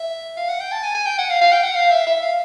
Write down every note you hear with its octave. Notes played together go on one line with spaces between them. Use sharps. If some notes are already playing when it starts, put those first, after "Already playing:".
Already playing: E5
F5
F#5
G5
A5
G#5
G#5
G5
F#5
F5
F5
G5
F#5
F5
E5
E5
F5